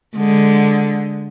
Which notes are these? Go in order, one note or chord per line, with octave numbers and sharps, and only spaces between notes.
D3 G#3